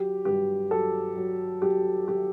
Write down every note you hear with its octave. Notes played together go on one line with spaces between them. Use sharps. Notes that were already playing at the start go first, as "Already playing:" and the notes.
Already playing: F#3 G4
G2 G4
F#3 A4
F#3
F#3 G4
F#3 G4